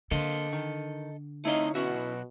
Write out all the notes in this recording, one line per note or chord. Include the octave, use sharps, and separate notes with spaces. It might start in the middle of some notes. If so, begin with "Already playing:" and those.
D3 A#3 A4 C5 D#5
D#3
A3 C4 D#4 E4 C#5 D#5 F5
B1 B2 C#4 E4 F#4